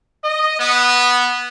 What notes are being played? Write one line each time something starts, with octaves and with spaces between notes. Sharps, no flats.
D#5
B3